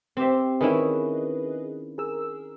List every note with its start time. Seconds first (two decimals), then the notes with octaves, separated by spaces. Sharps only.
0.17 C4 G4 E5
0.61 D#3 C#4 E4 G#4 B4 D#5
1.98 G#4 A#4 E6